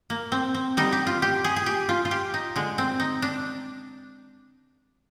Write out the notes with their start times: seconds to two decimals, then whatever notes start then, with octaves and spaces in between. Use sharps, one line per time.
0.10 A#3
0.32 C4
0.54 C4
0.77 D3 G3 D#4
0.92 G4
1.07 F4
1.22 G4
1.44 G#4
1.56 G#4
1.66 G4
1.89 F4
2.05 F4
2.11 G4
2.34 D#4
2.56 D3 G#3
2.78 C4
3.00 D#4
3.22 D4